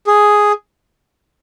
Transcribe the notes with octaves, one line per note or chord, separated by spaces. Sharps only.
G#4